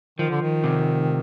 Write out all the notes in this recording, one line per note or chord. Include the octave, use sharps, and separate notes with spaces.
D#3 F3
D3
D#3
C3